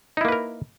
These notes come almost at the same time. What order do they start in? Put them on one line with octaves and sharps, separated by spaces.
D#4 E4 A#3 B4 A#4